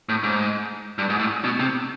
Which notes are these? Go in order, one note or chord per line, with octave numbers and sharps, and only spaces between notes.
A2
G#2
G2
G#2
A2
B2
C3